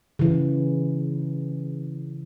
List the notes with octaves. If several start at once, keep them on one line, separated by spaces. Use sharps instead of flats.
C#3 E3